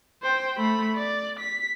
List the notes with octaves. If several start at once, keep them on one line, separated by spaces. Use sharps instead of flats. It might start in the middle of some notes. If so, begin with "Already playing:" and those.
C5 G5
A3 B5
D5
B6